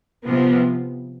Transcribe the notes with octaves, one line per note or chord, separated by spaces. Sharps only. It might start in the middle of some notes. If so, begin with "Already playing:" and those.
C3 F3 B3